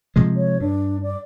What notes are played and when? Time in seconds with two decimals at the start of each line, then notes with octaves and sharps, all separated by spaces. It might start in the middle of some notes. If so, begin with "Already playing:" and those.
0.16 C3 F3 G#3
0.36 C#5
0.60 G2 D4
1.03 D5